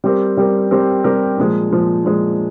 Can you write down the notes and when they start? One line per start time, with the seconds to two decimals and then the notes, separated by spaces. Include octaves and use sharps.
0.04 G3 C4 G4 A#4
0.37 G3 C4 G4 A#4
0.71 G3 C4 G4 A#4
1.04 G3 C4 G4 A#4
1.38 A#2 F3 G#3
1.71 A#2 F3 G#3
2.04 A#2 F3 G#3